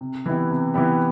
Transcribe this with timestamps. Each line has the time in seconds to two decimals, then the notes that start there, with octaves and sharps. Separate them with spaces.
0.01 C3
0.26 E3 B3 E4 G4
0.50 C3
0.74 E3 B3 E4 G4